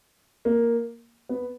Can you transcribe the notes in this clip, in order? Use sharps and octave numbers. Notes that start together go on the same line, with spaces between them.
A#3
B3